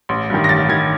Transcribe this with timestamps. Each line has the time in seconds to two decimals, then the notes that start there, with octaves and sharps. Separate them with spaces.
0.09 A1
0.30 G2 D#3
0.44 A#6
0.49 A1 A6
0.69 D#3 G#6